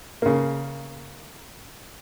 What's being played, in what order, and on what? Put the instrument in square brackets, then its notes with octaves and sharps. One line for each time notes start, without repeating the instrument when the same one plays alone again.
[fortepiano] C#3 A#3